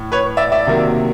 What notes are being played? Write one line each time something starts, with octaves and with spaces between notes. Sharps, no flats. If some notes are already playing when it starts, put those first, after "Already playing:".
Already playing: A2
B4 C#5
D5 E5
D5 E5
C3 D#3 F#3 A#3